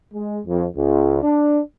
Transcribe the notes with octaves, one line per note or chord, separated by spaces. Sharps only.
G#3
F2
C#2
D4